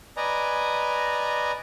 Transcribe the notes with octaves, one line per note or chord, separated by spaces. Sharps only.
B4 D5 D#5 G#5 A#5